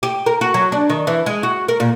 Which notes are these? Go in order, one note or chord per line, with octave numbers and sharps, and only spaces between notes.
G4
A#4
F#4
F#3
D4
D#3
E3
G#3
F#4
A#4
A#2